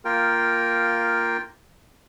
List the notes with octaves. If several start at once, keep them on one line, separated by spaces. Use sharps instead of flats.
A#3 F4 A#4 G5